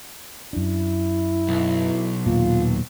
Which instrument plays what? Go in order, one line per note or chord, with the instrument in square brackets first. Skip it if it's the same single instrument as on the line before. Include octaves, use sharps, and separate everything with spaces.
[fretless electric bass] F#2 D4 [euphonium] E4
[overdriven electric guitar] B1
[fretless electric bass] D#2 A#2 [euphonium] F4